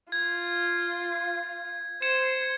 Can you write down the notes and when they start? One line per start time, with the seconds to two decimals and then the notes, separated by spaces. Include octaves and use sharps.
0.12 F4 G#6
2.02 C5 G#6 C#7 E7